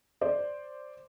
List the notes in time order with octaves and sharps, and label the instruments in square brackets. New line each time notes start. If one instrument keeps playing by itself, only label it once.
[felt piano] C5 D5